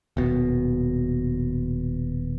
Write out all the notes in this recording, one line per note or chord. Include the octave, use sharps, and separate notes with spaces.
D#1 B2